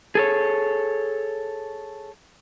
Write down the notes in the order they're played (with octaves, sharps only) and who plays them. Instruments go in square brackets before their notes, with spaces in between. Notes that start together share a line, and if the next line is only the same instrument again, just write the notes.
[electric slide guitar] G#4 A4 C#5